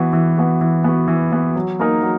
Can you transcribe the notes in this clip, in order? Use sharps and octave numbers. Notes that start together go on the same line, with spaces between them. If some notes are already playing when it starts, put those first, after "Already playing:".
Already playing: E3 B3 F#4
E3
B3 F#4
E3
B3 F#4
E3
B3 F#4
F#3
A#3 D#4 A#4
F#3